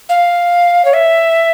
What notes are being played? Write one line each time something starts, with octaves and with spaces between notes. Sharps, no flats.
F5
C#5
E5